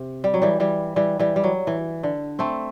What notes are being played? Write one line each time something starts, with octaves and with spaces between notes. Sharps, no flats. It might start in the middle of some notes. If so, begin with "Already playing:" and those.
Already playing: C3
G3
F#3
E3 G3
E3 G3
E3 G3
E3 G3
G3
F#3
E3
D3
A3 C4